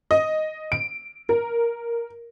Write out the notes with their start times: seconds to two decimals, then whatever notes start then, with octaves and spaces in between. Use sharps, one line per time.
0.11 D#5
0.72 D7
1.29 A#4